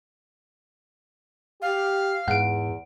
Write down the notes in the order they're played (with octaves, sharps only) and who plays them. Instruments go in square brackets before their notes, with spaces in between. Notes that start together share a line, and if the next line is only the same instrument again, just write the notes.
[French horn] G4 [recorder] F5
[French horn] E2 [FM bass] G#2 [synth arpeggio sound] F#5 D7